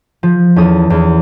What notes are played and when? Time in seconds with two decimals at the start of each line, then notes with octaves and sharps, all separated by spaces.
0.23 F3
0.56 E2 C#4 A4 D#6
0.90 E2